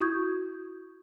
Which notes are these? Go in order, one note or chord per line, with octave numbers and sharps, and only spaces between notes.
E4 F#4 C#6 D#6 G6 G#6